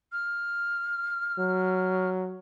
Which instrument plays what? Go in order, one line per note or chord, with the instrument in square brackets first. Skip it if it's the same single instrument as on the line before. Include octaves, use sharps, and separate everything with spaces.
[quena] F6
[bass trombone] F#3